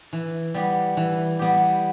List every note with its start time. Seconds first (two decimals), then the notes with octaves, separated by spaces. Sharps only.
0.13 E3
0.54 G3 B3 G4
0.97 E3
1.39 G3 B3 G4